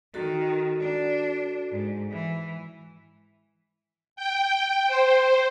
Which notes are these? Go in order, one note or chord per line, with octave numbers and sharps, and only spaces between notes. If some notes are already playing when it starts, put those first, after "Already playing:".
D#3 F#4 A4
D4
G#2
E3
G5
C5